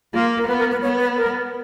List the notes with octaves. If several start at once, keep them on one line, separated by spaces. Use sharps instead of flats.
A#3 F4
A#4
B3 B4
A#4
B4
B3 C#5
B4
A#4